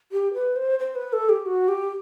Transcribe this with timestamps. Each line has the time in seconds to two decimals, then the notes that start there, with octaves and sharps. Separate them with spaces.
0.12 G4
0.34 B4
0.56 C5
0.79 C5
0.95 B4
1.13 A4
1.29 G4
1.46 F#4
1.68 G4